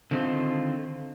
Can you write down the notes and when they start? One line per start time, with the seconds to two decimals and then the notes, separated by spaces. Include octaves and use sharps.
0.11 D3 D#3 C4 D#4 F4 C5